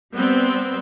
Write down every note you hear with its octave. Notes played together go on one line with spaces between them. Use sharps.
G3 B3 C4